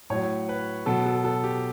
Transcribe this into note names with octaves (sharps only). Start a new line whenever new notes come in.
A2 F#3 C#5
B4
B2 F#3 A4
A4
A4
G4